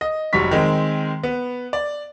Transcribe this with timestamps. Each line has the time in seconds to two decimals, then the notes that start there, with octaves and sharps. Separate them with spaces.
0.01 D#5
0.33 F1 F#3 G3 C#6 B6
0.51 D#3 G#3 C4
1.23 B3
1.73 D5